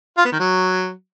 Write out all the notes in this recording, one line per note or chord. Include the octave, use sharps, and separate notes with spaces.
F4
B3
D#3
F#3